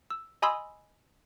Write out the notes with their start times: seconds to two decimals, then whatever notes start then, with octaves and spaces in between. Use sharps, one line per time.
0.11 E6
0.42 D#5 G#5 B5 C6 D#6 E6